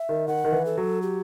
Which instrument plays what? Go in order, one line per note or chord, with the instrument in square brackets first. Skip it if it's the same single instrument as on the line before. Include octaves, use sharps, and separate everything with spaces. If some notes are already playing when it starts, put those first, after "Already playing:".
Already playing: [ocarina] E5
[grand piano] D#3
[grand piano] D#3 [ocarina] F#5
[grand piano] D#3
E3
[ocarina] A4
[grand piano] F#3
[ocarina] G4